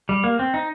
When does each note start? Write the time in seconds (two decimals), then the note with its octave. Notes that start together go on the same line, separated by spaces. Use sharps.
0.09 G3
0.24 A#3
0.39 C4
0.54 D#4